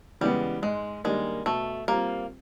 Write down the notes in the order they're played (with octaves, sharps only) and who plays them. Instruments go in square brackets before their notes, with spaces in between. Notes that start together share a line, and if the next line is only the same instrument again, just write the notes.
[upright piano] C#3 E3 G#3 B3 [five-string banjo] G3
[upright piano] G#2 [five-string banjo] G#3
[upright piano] D#3 G3 A#3 D4 [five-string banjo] G#3
[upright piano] B2 [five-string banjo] A3
[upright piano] G3 C4 F4 [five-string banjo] A#3